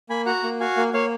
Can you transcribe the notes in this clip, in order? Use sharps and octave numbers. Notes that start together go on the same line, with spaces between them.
A#3 G#5 B5
F#4 F#5 A#5
A#3
F#4 F5 G#5
A#3
A#3 C#5 F5